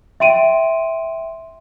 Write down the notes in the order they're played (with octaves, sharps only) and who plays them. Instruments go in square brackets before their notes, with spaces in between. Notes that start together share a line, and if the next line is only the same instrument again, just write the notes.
[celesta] E5 G5 C6 D7 D#7